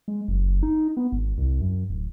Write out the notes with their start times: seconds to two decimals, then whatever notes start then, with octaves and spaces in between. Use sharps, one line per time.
0.08 G#3
0.28 F#1
0.63 D#4
0.97 B3
1.12 G#1
1.38 C2
1.61 F#2
1.90 D1